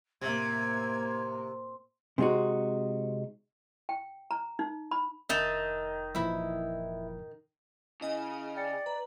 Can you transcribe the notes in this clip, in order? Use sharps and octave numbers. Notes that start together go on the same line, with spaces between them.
A2 C3 A#3 G#6
C3 G#3 C4 D#4 F#4
G5
A#5
D#4
B5
F1 D#3 D#4 E5 A5
A#2 E3 F3 E4 E5
C#3 E4 D#5 G#5
D5 G5 A6 C#7
B4 A#5